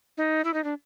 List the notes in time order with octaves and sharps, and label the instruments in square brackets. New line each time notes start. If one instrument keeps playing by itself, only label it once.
[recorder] D#4
E4
D#4
D4